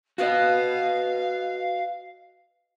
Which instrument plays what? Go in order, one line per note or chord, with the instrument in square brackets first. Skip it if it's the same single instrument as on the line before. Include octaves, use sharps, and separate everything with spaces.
[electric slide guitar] F#4 B4 D#5 [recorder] F5